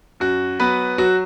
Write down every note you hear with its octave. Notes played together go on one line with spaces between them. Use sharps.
F#2 F#4
F#3 B3 B4
F#3 F#4